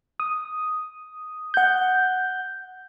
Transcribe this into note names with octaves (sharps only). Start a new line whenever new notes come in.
D#6
F#5 G6